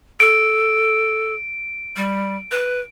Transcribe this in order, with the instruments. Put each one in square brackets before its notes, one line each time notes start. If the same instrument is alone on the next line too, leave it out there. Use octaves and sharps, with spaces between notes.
[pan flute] A4 [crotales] D7
[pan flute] G3
B4